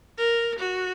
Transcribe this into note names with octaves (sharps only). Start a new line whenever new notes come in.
A#4
F#4